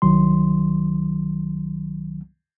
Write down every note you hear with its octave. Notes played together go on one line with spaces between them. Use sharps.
C2 D#3 F#3 C6